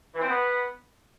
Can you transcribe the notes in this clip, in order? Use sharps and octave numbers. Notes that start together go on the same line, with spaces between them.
E3
C4
B3